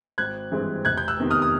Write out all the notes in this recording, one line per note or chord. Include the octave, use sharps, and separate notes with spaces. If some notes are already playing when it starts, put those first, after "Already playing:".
G#1 F#6 G#6
G2 E3 G#3 C4
F1 F#6 G#6
G6
E6 F#6
E2 C3 D#3
D#6 F6
D#6